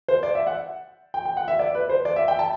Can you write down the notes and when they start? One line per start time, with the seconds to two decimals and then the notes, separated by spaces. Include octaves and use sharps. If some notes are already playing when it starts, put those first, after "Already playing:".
0.08 C5
0.23 D5
0.35 E5
0.47 F#5
1.14 G5
1.25 G5
1.37 F#5
1.48 E5
1.59 D5
1.75 B4
1.89 C5
2.05 D5
2.16 E5
2.28 G5
2.39 A5